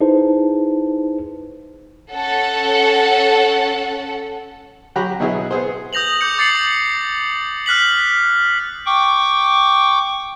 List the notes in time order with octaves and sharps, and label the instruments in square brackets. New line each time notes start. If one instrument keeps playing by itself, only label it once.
[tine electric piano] D#4 E4 G#4 B4 C5 A5
[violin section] C#4 A4 F#5
[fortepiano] F#3 F#4 G4 A#5 B5
B2 F#3 B3 E4 G#4
B3 G#4 C5
[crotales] D#6 G6 A#6 F7 F#7
D6 G6 C#7
D6 A6 C7 C#7 F#7
F6 F#6 B6 F#7
[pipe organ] G5 C#6 D6